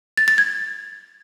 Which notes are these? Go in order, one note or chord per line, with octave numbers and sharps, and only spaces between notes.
A6
A6
G#6